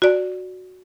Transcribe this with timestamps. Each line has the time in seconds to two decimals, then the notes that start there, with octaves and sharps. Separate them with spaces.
0.02 F#4 D5